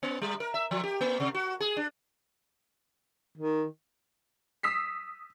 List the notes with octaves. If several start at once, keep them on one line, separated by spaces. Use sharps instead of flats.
B3
G3
A#4
E5
F3
G4
A#3
C3
F#4
G#4
D4
D#3
D#6 E6 B6 C7